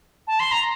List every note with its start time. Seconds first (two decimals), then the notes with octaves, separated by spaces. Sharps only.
0.27 A5
0.40 C6
0.52 A#5